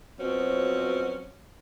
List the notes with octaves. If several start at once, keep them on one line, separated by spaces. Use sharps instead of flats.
B2 F3 F#3 C4 C#4